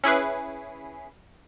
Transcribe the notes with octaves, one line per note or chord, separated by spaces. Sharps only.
C#4 E4 G#4 B4